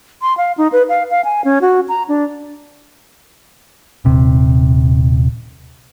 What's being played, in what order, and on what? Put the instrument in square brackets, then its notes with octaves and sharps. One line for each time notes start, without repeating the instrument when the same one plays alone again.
[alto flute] C6
F5
D#4
B4
F5
F5
G#5
C#4
F#4
A#5
D4
[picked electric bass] D#1 C3